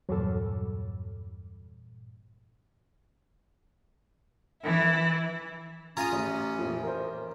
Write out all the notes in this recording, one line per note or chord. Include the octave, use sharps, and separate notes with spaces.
E2 G2 A#2 F#3 A4
E3 E4
C#4 F4 G#4 F5 A#5 D#6
A1
F2 A#2
A#4 C5